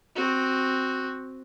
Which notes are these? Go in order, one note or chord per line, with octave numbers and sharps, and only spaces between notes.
C4 F#4